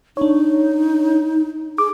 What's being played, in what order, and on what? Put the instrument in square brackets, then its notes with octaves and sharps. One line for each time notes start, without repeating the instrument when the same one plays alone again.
[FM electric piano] D4 C#5 [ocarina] D#4
[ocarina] G#4 [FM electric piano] D6